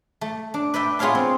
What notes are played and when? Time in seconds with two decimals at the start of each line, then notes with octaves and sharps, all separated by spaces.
0.21 A3
0.54 D4
0.74 B4 D5 E5 G5
0.99 B3 F4 G#4 C#5 F5 A5
1.15 C4